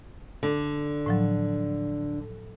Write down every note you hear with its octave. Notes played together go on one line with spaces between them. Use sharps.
D3
A2 F3 F#3